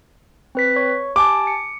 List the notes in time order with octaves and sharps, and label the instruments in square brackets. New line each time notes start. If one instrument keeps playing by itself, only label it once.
[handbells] C4 B4 B6
C#5 C#6
[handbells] G4 G#5 A5 [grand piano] D6
[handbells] C#7